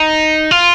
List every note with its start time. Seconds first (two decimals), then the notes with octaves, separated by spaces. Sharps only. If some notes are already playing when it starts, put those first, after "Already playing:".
Already playing: D#4
0.51 F4